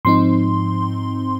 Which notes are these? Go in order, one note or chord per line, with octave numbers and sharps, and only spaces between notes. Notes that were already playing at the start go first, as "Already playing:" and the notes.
G#2 F3 C4 D#4 C6